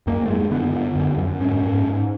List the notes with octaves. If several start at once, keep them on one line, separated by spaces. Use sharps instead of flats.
F#2 A#3
A3
F#2 G#3
D3 B3
D3
F#2
F#2
G#2 C#4
G#2
G#2